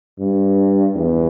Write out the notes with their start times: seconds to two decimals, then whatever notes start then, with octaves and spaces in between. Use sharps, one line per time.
0.19 G2
0.95 E2